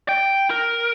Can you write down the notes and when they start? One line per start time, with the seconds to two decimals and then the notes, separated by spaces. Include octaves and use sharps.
0.09 G5
0.50 A#4